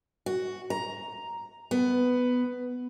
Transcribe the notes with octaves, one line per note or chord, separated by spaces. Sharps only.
F#4
A#5
B3